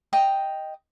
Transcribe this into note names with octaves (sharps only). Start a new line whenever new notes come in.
D#5 G5 A#5